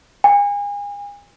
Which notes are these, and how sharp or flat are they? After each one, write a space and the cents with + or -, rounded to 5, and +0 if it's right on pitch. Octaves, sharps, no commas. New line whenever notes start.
G#5 -35